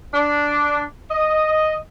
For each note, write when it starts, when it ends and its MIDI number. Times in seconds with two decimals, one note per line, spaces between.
0.14 0.82 62
1.09 1.75 75